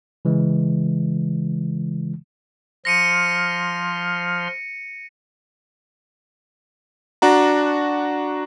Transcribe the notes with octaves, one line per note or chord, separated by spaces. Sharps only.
C#3 E3 G#3
F3 C6 F6 A#6 C#7 D#7
D4 F#4 A#5